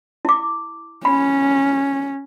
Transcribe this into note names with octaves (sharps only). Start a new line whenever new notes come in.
E4 D6
C#4 B5